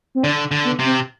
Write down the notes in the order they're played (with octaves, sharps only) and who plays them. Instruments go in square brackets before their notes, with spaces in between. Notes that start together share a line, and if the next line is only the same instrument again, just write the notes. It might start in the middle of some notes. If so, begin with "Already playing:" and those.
[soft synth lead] C4
[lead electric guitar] D3 [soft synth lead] D4
[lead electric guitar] D3
[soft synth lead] B3
[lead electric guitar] C3
[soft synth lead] C4